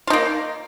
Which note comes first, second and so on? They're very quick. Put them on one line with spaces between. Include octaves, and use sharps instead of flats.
F4 D#4 A#3